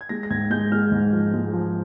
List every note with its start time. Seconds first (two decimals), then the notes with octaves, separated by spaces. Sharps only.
0.01 G#6
0.09 G#3 A#6
0.23 A#6
0.30 G#2 G#6
0.50 G#3 G6
0.72 G#3 F6
0.92 G#2
1.13 F3
1.34 G#3
1.53 F3